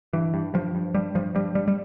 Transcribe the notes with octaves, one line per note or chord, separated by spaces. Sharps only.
G2 E3
G2
G2 F3
G2
G2 G3
G2 F3
G2 G3
G2 G3
G3